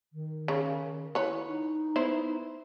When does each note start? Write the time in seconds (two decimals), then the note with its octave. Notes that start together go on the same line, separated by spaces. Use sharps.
0.13 D#3
0.48 C#3
1.15 E4 B4 C#5
1.47 D#4
1.96 B3 E4 C5